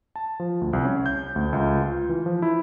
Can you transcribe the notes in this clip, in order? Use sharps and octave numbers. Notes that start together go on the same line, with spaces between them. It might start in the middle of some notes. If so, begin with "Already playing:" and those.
A5
F3
D2
C2
C#4
G6
D2
C#2
F4
E3
F3
E4